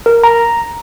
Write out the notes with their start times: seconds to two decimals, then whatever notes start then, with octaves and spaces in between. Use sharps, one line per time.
0.06 A#4
0.23 A#5